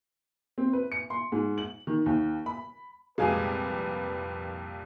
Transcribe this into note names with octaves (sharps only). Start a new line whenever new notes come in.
C4
B4
C#7
C6
G#2
F#7
D#3
D#2
B5
C2 F2 A#2 G#3 B4 F5 G#5